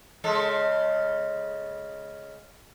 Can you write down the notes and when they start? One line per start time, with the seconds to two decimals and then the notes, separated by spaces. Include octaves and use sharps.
0.24 C#3 G#3 A4